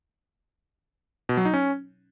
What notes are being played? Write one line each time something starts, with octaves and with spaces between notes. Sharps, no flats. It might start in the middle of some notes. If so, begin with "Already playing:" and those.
B2
F#3
D#4
C#4